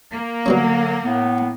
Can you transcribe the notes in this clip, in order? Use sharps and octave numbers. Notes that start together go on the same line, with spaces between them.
A#3
B2 D3 F#3 G3 C#4
A2 B3